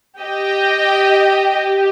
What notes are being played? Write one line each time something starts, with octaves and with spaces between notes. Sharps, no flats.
G4 D#5 G5
G4